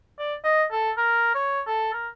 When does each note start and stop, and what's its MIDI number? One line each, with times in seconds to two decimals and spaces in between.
0.19 0.35 74
0.44 0.63 75
0.72 0.91 69
0.98 1.33 70
1.35 1.61 73
1.67 1.92 69
1.93 2.08 70